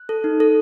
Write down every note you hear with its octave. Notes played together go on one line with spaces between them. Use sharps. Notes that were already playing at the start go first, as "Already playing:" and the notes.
Already playing: F#6
A4
D#4
A4